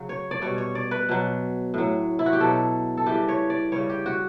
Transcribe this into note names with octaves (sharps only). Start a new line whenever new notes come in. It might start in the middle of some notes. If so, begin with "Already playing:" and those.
Already playing: C#3 F#3
C#5
D5
B2 G3 C#5
C#5
D5
B4
B2 F#3
A2 F#3
E4
F#4
G4
B2 F#3 A4
A4
C#3 E3 G3 G4
C#5
D5
C#3 G3 C#5
G4
F#4